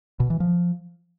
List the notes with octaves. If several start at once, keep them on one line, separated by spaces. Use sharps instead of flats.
B2
E3
F3